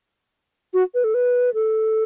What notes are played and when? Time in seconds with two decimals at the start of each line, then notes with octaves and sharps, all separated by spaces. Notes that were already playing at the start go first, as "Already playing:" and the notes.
0.74 F#4
0.94 B4
1.04 A4
1.14 B4
1.54 A4